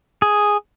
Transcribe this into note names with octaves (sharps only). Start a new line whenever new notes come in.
G#4